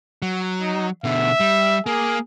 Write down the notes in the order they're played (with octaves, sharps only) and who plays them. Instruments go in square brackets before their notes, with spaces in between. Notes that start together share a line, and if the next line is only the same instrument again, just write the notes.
[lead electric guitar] F#3
[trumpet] D#4
[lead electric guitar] B2 D3 [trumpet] E5
[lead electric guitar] G3
[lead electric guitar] A#3 [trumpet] G#4